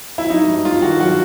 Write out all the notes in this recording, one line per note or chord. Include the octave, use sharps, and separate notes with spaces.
E4
F#3 D#4
G2
G2 F4
D#3 F#4
F#3 F#4